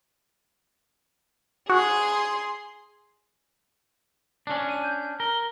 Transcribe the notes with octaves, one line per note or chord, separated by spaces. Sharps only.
F#4 G#4 C6
C#4 D4
D#7
G6
A#4 G7